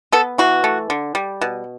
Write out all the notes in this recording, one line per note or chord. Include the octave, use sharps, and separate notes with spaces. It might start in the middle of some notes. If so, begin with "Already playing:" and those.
B3 A4
E3 F#4
A3
D3
G3
B2